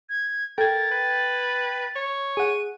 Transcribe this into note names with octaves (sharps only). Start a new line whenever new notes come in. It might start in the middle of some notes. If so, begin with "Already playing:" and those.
G#6
A4 A#4 G5 G#6 A6
B4
C#5
G#4 F#5 D#7